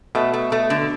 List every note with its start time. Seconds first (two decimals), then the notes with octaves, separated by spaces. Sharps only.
0.15 B2 A3
0.34 A3
0.52 A3
0.70 D3